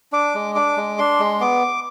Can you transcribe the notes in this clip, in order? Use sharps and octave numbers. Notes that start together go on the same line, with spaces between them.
D4 D6
G#3
D4 D6
G#3
D4 C6
G#3
B3 D6